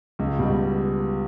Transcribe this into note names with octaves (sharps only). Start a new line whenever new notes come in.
C#2
B2 G3